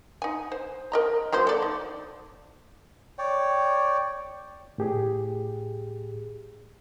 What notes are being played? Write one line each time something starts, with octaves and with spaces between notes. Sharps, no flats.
D#4 G#5
C5
A#4 D#5 A#5
F#3 A#3 C5
A4 D5
D#4
C#5 D5 G5
A2 G4 G#4